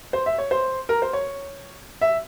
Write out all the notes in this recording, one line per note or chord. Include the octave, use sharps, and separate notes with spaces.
C5
E5
C#5
C5
A#4
C5
C#5
E5